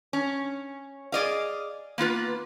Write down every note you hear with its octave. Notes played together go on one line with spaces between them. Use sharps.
C#4
G#4 D5 D#5 F5
A#3 B3 F4 B4